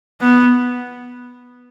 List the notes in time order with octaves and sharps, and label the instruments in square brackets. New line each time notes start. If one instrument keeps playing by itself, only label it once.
[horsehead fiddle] B3